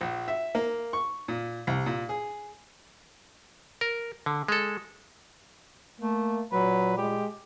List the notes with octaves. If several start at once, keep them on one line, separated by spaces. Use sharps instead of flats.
A#1
E5
A#3
C#6
A#2
C2
A#2
G#4
A#4
D3
G#3 A4
A3 A#3
A#2 F#3 B4
G#3 G4